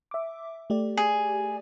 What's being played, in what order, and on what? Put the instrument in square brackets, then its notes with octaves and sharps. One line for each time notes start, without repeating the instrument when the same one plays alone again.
[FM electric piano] E5 D6
A3 G4 D5
[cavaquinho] G#4